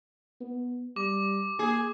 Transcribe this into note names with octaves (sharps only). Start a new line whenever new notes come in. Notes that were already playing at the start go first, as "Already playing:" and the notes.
B3
G3 D6
A#3 G#4